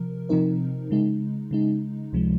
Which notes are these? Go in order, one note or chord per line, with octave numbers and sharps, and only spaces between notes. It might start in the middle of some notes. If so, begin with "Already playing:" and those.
Already playing: C3 F3 A#4
C3 F3 C4 D#4 A#4
C#3 G#3 D#4
C#3 G#3 D#4
C#2 C3 F3 G#3